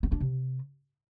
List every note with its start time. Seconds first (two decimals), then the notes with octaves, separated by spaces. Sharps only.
0.03 C4
0.12 D4
0.20 C3